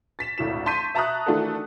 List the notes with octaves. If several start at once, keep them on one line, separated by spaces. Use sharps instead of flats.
A6 B6 E7
G#1 D2 A2 E7
A5 C6 C#6 G6 B6 D#7
E5 A5 A#5 C#6 D#6 F#6
D#3 E3 A3 D4 F#4 A4